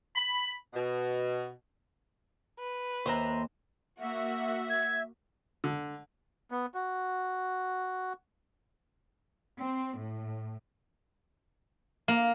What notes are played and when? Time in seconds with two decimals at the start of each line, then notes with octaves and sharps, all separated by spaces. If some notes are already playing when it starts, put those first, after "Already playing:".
0.15 B5
0.74 B2
2.59 B4
3.06 D#2 A#3 C5 E5 A#5
4.01 A#3 F#4 E5
4.70 G#6
5.64 D3
6.51 B3
6.75 F#4
9.60 C4
9.98 A2
12.08 A#3